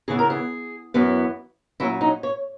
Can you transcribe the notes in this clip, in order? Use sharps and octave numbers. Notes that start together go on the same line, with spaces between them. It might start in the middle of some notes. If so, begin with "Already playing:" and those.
C#3 E3 B3 G#4
A#4
G#4
F#2 E3 B3
A#2 F#3 C#4 E4
D#4
C#5